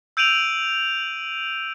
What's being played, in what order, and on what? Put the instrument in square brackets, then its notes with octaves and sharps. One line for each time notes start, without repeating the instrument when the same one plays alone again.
[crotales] E6 G6 D7 D#7 F7 F#7